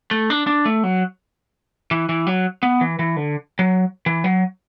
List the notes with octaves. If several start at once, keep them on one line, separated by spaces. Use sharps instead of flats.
A3
D4
D4
A3
F#3
E3
E3
F#3
B3
E3
E3
D3
F#3
E3
F#3